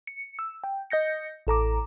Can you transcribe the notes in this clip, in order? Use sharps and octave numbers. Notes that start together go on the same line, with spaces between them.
C#7
E6
G5
D#5 G6 A#6 C#7
A1 A4 A#5 D6